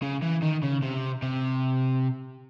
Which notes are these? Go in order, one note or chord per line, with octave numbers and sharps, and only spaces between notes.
C#3
E3
D#3
C#3
C3
C3